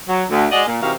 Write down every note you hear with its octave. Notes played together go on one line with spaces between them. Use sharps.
F#3
D2
G#3 F#4 G#4 D5 D#5
A#2
C3 E3 D#4 F#4 A#4 F5